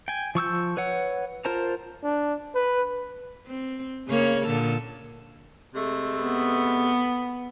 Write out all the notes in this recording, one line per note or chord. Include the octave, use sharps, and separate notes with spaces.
G5 G#5
F3 C#6 E6 G6
B4 C#5 F#5
F4 A#4 C5 A5 A#5
D4
B4
C4
C#3 A#3 C#5
A#2 D3 A4
C3 G#3 A3
B3